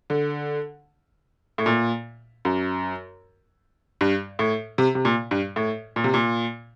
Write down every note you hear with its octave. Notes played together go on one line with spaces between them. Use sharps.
D3
A2
A#2
F#2
G2
A2
C3
C3
A#2
G2
A2
A#2
C3
A#2